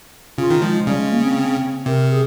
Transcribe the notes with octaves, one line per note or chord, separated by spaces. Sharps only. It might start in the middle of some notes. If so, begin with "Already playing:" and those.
C#3 F4
D#3
F3 G#3
C#3 G3
G#3
A#3
C4
C3 A#4
G#4